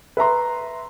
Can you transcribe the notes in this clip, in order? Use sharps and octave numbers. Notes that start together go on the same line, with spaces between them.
B4 E5 A#5 C6